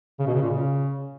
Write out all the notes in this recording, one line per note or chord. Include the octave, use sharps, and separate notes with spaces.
C#3
B2
C#3
A#2
C#3